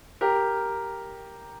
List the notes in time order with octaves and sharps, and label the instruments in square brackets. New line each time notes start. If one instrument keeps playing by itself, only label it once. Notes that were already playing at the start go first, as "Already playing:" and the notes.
[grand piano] G4 A#4